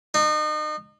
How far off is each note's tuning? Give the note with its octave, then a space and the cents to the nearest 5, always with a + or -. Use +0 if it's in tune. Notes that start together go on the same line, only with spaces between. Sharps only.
D#4 -35